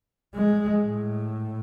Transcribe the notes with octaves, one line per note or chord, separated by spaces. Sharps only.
G#3
A2